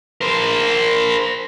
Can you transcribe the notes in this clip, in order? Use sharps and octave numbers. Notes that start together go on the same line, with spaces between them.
A#4 C5